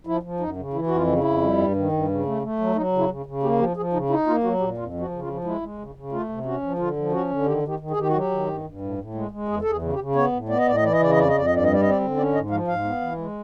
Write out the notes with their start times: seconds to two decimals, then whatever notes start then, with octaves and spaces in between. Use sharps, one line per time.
0.07 F3 E4
0.23 F3
0.40 F#2 D#4
0.56 C#3
0.73 E3 E4
0.87 F2 F#4
0.96 F4
1.07 C#3
1.19 F2 E4
1.41 G3
1.57 G2
1.75 D#3
1.92 G2
2.08 C#3
2.25 A3
2.42 A3
2.59 F#3
2.75 F#3 D#4
2.92 C#3
2.98 E4
3.10 C#3
3.26 C#3
3.43 A#3 G4
3.59 F3 G4
3.77 F3 G#4
3.93 C#3 D#4
4.10 D#4 E4
4.27 A#3 F4
4.44 F#3 F#4
4.60 A#2 G4
4.78 F2 F4
4.94 F3
5.00 F#4
5.11 C#3
5.22 F4
5.28 F3
5.44 G#3 E4
5.61 G#3
5.79 C#3
5.95 C#3
6.12 A3 F4
6.29 C3
6.46 C#4 F#4
6.62 F3
6.78 D3 F4
6.96 F3
7.12 C#4 F#4
7.30 D3
7.46 D#3 G4
7.63 D#3
7.68 G4
7.80 D#3
7.91 G#4
7.96 D#3 G4
8.09 F#4
8.13 F#3 G4
8.30 D#3
8.47 G2
8.64 G2
8.81 A2
8.98 A2
9.14 G#3
9.31 G#3
9.48 E2 G#4
9.62 E2 A4
9.70 G#4
9.82 C#3
9.93 G4
9.99 C#3
10.15 B3 C#5
10.32 A2
10.49 B3 D5
10.58 D#5
10.66 A2 D5
10.75 D#5
10.83 E3 D5
10.92 D#5
10.99 C#3 D5
11.10 D#5
11.16 F2 D5
11.28 D#5
11.33 F2 D5
11.45 D#5
11.50 G2 D5
11.63 G3 D#5
11.72 D5
11.81 C4 D#5
11.90 D5
12.00 D3
12.16 C#4 D5
12.34 G#2 D#5
12.50 F3 F5
12.67 G#2 F5
12.84 B3
13.01 E3
13.18 G#3